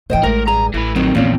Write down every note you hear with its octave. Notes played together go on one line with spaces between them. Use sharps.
A2 E3 C5 D#5 G5
A1 A2 G#3 A#4
G2 G#4 A#5
A1 E3 A3 B4
F2 D#3 F#3 C4
A#1 E2 A#2 C4 C#4